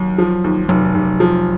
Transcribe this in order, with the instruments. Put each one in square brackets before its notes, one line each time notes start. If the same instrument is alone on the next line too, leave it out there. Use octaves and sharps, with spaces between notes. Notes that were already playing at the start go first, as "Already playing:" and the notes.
Already playing: [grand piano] D#2 [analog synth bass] F#3
[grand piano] F3
D#2
[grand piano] F1 [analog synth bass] F#3
[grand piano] F1
F3